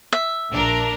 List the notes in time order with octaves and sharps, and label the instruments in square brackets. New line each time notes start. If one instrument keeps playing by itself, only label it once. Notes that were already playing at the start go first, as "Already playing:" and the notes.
[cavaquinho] E5
[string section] A#1 D4 A#4